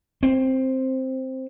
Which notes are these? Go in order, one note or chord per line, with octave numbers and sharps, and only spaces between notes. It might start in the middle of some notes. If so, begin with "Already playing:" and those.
C4